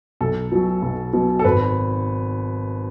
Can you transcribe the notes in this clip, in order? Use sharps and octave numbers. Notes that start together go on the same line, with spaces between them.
B1 A4
B2 F#3
B1
B2 F#3
A4
G#1 B4